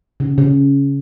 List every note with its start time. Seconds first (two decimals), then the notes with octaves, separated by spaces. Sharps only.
0.20 C#3
0.38 C#3